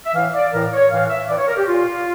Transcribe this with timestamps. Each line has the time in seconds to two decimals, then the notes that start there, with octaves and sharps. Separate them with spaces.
0.06 E5
0.14 A2 E3 F5
0.33 D5
0.53 A2 E3 A#4
0.72 C#5
0.90 A2 E3 F5
1.10 E5
1.28 A2 E3 D5
1.38 C#5
1.47 A#4
1.57 G4
1.67 A#2 F4